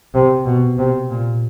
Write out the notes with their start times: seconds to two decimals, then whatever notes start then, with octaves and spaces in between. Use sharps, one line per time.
0.14 C3
0.46 B2
0.78 C3
1.10 A#2